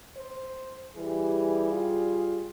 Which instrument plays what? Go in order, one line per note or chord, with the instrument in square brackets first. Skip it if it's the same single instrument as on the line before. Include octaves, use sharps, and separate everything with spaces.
[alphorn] C5
[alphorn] E3 [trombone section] G3 G4 G#4
[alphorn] F4